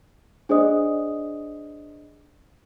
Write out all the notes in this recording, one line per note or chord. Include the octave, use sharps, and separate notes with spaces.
D4 G#4 C5 D5 D#5 D#6